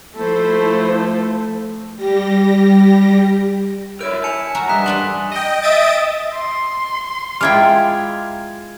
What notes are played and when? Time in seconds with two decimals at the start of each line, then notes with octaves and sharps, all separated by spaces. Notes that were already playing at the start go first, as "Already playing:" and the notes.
0.16 F3 A3 E4 A4 C5
1.96 G3 G4 A#6
4.01 E4 A#4 C#5 F6 G6 D7
4.24 G#5 A5 C#7 F7
4.55 F#4 A#4 E5 A#5
4.69 G2 D#5 F#6 B6 E7
4.86 G3 D4 A4 G#5 C6 F#7
5.31 D#5 G5
5.62 D#5 E5 D#6 A6 D7
6.33 C6
7.41 G#3 E4 F4 G5 A#5 D6 F6 G#6